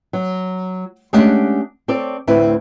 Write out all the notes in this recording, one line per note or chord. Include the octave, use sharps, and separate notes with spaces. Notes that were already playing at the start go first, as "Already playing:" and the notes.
F#3
G#3 A3 C#4 D4 G4 F#5
C4 A4 C#5 D5
D2 A2 C4 E4 B4